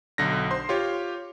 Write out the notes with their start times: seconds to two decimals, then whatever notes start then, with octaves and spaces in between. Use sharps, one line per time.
0.18 B1 D3 A#6
0.51 C5 C6
0.69 F4 G4 C#5